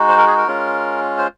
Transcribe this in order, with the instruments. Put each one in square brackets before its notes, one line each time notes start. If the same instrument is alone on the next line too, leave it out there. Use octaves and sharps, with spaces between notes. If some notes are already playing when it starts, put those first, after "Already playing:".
Already playing: [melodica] G#3 D#4 F#4
C5
A#4
G#4
A#4
G#3 C#4 F4
C5